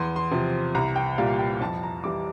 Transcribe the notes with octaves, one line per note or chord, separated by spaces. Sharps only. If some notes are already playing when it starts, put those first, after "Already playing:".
Already playing: E2 C6
C6
C3 F3
C2 A#5
G5
A#2 G3 A#3 F5
G5
F2 A5
A#5
E3 G3 D6